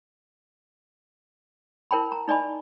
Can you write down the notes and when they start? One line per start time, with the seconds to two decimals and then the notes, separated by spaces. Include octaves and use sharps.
1.91 E4 A#4 C#5 G5 A5 B5
2.12 A#5
2.28 D#4 D5 D#5 G#5 B5